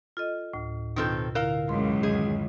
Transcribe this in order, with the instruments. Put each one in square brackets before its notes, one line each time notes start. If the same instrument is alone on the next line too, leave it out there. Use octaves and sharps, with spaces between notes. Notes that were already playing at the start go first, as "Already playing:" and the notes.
[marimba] F4 A4 D#5
D2 A2
[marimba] B2 F4 G6 [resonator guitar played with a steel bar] D#3 C4 A4
[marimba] D3 E4 [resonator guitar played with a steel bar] A#4 F5
[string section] C#2 F#2 [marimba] C6
[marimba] D#3 [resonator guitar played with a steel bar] G#4